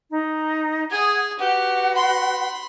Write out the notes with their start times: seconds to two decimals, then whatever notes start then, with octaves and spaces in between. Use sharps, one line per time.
0.10 D#4
0.91 G#4 F#5 D#6 G#6
1.39 F#4 G4 B4 F#5
1.94 B5 C6